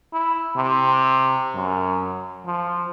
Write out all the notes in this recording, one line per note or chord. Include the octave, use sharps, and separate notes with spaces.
E4
C3
F#2
F3